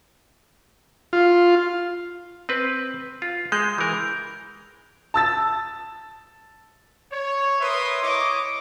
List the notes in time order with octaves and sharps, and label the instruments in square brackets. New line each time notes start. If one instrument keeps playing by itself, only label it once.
[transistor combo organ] F4
[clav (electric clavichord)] C4 B4
F4
[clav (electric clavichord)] G#3 [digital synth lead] G6
[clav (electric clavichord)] E3 A#4
[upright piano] A5 E6 A6
[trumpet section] C#5
A#4 B4 E5 C6 D#6
E4 C#5 D#5 D6